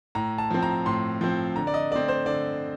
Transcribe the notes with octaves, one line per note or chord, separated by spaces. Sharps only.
A2 A#5
A5
F3 C4
A#5
A2 C6
F3 C4
D3 A#5
D5
D#5
A3 C4 D5
C5
D3 D5